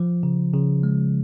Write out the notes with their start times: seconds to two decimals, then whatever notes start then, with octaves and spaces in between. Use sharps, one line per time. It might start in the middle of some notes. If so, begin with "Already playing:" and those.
Already playing: F3
0.23 C#3
0.53 C#3
0.83 G#3